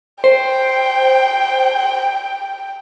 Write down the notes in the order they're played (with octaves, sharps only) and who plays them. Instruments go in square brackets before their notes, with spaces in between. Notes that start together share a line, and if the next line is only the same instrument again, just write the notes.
[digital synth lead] C5 [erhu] G5